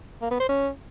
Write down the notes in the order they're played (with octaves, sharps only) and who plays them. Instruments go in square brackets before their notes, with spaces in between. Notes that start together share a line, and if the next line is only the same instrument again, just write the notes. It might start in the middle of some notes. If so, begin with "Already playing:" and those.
[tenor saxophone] A#3
B3
C5
C#4